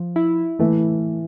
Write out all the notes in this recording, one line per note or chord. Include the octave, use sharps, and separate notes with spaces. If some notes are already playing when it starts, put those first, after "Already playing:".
Already playing: F3
E4
E3 A3